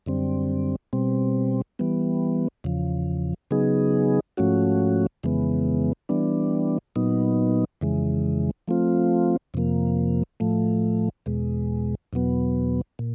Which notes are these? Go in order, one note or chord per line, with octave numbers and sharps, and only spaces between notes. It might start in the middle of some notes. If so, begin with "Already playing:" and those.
F#2 D3 G3 C4
B2 G3 C4
E3 G3 B3
E2 C#3 F3
C#3 F#3 B3 D#4 G#4
G#2 F3 A3 C#4 F#4
F2 C#3 E3 G#3 B3
E3 G3 B3 D4
A#2 F#3 B3 D#4
F2 C#3 E3 G#3
F3 A3 C4 F4
F2 C3 F3 A#3
A2 F3 A3
E2 B2 G#3
E2 B2 F#3 B3
A#2